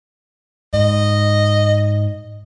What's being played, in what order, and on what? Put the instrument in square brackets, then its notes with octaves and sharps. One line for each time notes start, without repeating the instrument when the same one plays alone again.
[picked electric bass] G#2 [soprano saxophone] D#5